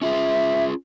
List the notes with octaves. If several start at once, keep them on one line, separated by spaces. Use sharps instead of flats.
C#4 F4 G#4 E5